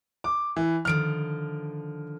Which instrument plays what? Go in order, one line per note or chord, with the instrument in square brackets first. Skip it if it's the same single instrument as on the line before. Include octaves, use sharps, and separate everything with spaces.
[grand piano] D6
E3
[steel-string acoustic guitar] D3 D#3 F3 [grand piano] F6 D7